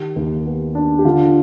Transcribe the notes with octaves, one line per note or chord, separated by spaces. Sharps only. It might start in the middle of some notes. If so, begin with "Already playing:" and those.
Already playing: D#3 G4
D#2
B3
D4
G4
D3 F4